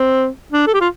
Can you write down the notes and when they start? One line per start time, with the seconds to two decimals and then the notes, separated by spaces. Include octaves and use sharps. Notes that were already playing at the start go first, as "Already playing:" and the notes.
Already playing: C4
0.52 D4
0.67 A4
0.73 G4
0.81 F4